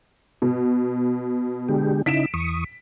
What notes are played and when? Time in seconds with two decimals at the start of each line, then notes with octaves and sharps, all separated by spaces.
0.42 B2
1.69 D3 G#3 G4
2.06 C#3 D#4 E4 B6 D7 E7
2.34 E2 C#6 D#6